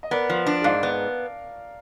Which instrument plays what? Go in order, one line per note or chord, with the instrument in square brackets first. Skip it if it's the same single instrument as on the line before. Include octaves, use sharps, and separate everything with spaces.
[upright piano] D#5
[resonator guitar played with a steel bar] B3 [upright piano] A#4 D5
[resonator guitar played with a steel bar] F3
D4
[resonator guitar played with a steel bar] G#2 [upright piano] D5 F5
[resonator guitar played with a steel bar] B3